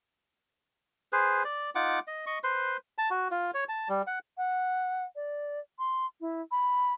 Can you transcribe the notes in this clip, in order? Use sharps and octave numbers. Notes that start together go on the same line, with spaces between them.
G#4 B4 C5
D5
D#4 F4 F#5 D6
D#5
D#5 C#6
B4 C5 C6
A5
F#4
F4
C#5
A5
G3
F#5
F#5
D5
C6
E4
B5